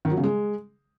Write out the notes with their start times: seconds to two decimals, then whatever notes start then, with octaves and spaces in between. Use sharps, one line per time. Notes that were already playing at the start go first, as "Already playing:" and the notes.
0.05 D#3
0.11 F#3
0.17 C#3
0.23 G#3